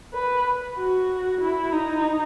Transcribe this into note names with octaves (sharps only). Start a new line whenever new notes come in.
B4
F#4
E4
D#4